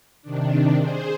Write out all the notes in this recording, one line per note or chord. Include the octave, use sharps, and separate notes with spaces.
C3 D#3 D4
G#4 C5